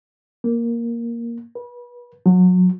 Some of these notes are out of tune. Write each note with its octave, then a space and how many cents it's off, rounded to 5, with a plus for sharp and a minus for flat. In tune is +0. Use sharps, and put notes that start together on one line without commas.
A#3 +5
B4 -30
F#3 -25